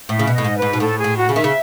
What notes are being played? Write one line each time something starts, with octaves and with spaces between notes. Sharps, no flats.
A2 E5
C#3
B2
A2 D#5
G#2
B4
G#2
B2
A2 A4
G#4
A2
F#4
C#3
D#3 E5
C#3